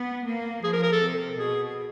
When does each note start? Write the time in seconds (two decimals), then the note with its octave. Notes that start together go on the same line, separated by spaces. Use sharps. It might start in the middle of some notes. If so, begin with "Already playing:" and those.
Already playing: B3
0.25 A#3
0.63 F3 G#4
0.73 A#4
0.83 A#4
0.92 A4
1.01 C3
1.39 B2 G#4